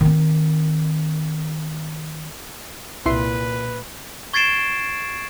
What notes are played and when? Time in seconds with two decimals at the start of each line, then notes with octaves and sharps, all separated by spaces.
0.01 D#3 C4
3.06 C2 A#2 E4 B4 C6
4.33 C#6 G#6 A6 C7 D7 E7